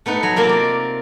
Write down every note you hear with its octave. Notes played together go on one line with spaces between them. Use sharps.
A3 B3 D#4 B4
F#3
C3 A#3 F4 A#4
D5